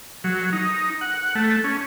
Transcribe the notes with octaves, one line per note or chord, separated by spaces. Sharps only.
F#3
D#4
F#5
A3
C#4